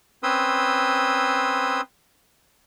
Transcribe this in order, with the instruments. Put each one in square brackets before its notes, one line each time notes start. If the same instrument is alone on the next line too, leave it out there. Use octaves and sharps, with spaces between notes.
[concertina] C4 C#4 B4 C6 D#6 E6